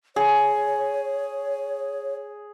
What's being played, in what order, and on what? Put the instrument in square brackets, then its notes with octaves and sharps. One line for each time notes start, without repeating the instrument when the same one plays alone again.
[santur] G#4 [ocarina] C#5